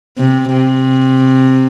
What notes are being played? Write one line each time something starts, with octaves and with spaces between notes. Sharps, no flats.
C3
C3